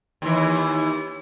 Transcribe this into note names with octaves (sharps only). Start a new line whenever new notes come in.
D#2 E3